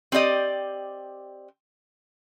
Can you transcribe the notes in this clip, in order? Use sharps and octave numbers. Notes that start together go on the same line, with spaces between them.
C4 G4 D5 D#5